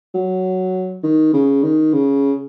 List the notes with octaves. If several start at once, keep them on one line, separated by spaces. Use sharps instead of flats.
F#3
D#3
C#3
D#3
C#3